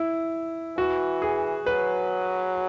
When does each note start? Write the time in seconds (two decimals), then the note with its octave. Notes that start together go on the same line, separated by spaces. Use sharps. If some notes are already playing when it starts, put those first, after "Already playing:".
Already playing: E4
0.77 E3 F#4
1.22 G#4
1.66 F#3 B4